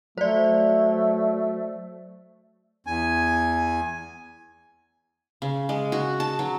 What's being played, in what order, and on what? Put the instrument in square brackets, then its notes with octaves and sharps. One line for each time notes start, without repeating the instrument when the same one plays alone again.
[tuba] F#3 [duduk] A3 [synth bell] C5 D5
[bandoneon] E2 G#5
[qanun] C#3
G#3
F#4
A5
F#3